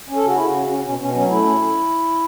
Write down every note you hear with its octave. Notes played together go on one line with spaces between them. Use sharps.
C#4
A4
C#3 F#4
C#3 E4
F#4
C#4
C#4
B2 C#4
B2 C#4
F#3 C#4
A3 E4
C#4